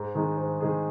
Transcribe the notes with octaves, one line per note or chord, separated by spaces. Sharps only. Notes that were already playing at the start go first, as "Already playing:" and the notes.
Already playing: G#2
D#3 G#3 D#4 G#4
G#2
D#3 G#3 D#4 G#4